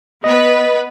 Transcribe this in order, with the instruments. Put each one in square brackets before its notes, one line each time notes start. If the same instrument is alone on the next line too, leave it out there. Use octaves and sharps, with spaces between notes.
[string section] B3 B4 [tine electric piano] D#5